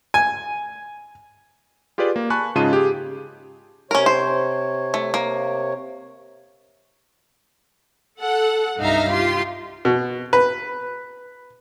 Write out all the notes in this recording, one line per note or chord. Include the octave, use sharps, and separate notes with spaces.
G#5
F4 G4 G#4 B4 D5
A#3
G#5 A5 B5 C#6 F#6
G#2 C#3 F4 D#5 A5 D#7
G4 G#4
C3 C#4 A#4 C#5
C5
A3
A#3
A4 F#5
C2 G2 D#4 E5 F5 A#5
F4 G4 C6
B2
B4